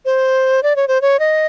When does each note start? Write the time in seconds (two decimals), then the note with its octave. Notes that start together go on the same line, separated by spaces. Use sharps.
0.05 C5
0.63 D5
0.76 C#5
0.88 C5
1.02 C#5
1.19 D#5